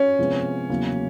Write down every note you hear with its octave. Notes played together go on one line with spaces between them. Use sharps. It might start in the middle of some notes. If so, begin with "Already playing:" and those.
Already playing: C#4
C3 F3 G#3 B3
E2 C#3 F#3 A#3